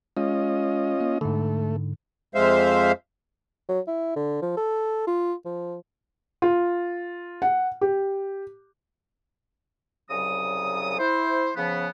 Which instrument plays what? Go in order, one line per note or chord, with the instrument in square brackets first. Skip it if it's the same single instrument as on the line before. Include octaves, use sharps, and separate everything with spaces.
[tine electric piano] G#3 [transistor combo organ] C#4 F4 D#5
[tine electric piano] A#3
[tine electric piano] G#2 D3 [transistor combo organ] A3
[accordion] F2 G#3 C5 E5 F5
[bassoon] F#3
E4
D3
F3
A4
F4
F3
[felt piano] F4
F#5
G4
[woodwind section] C2 C#3 F#3 D#6
E4 C5
C#3 F3 B3